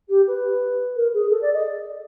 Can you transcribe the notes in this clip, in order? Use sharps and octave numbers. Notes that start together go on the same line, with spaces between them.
G4
B4
A#4
G#4
A4
D5
D#5